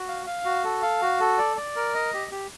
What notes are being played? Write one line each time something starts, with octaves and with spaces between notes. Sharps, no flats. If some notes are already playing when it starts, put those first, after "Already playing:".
Already playing: F#4
F5
F5
F#4
A4
F5
F#4
A4
D5
D5
A#4
D#5
G4
G4